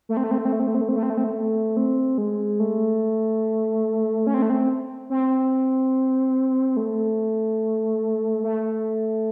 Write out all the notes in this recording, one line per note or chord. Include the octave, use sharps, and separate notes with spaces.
A3
C4
A3
C4
A3
C4
A3
C4
A3
C4
A3
C4
A3
C4
A3
C4
A3
C4
G#3
A3
C#4
C4
A3
C4
C4
A3
A3